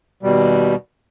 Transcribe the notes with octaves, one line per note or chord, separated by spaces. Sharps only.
D#2 B2 G3